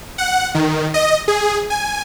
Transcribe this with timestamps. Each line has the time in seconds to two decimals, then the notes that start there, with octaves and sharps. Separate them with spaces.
0.18 F#5
0.55 D#3
0.94 D#5
1.28 G#4
1.70 G#5